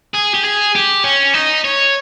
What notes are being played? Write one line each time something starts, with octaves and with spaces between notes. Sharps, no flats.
G#4
G4
G#4
G4
C#4
D#4
C#5